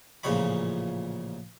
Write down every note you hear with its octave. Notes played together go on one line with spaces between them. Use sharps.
A1 A#2 C#3 F3 C#5 B5